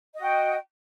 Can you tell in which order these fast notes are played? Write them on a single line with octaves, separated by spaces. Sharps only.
D#5 F#4 G5